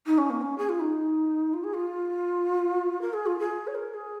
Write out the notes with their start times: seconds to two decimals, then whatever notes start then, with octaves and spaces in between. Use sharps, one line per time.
0.06 D#4
0.18 C#4
0.30 A#3
0.41 C#4
0.58 G#4
0.69 F4
0.80 D#4
1.53 F4
1.64 G#4
1.73 F4
3.01 A#4
3.13 G#4
3.26 F4
3.39 G#4
3.67 C#5
3.74 A#4
3.93 G#4